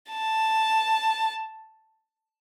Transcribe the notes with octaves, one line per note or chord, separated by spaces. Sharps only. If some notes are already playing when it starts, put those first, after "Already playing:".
A5